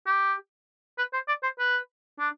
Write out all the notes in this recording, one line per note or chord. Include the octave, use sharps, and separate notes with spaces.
G4
B4
C5
D5
C5
B4
D4